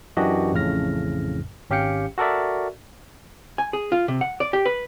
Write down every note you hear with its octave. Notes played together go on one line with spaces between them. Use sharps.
F#2 E3 D4 F#4 G4 D#5
A1 F2 A2 C#3 F6 A#6
G#1 C#4 G4 F5 G5 C#7
F#4 A4 A#4 D5 E5
G#5
G#4
F4
C3
F#5
D5
G4
B4